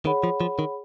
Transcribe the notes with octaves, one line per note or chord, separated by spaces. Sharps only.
D#3 G#4 C#5 F#5 B5
F3
F3
D#3